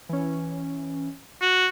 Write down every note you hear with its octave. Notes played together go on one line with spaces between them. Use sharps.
E3 C#4
F#4